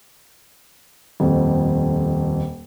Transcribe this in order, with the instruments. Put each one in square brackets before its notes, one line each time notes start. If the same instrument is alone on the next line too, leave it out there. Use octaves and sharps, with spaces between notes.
[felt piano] D#1 F2